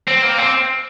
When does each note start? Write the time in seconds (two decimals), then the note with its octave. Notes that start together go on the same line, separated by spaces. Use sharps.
0.08 C4
0.23 A#3
0.38 C4